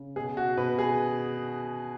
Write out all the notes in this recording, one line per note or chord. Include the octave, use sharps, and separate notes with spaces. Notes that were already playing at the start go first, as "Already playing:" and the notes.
Already playing: C#3
B2 G#4
F#4
B2 B4
G#4